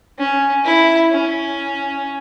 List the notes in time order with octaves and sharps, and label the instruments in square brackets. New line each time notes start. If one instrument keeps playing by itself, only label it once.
[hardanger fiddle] C#4
E4
C#4